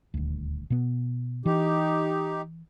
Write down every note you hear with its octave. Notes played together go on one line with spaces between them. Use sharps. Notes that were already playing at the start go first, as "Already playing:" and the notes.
D#1 D2
B2 B3
E3 D#4 G4